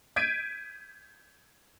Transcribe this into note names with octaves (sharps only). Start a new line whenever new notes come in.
G6 G#6 B6 D7 D#7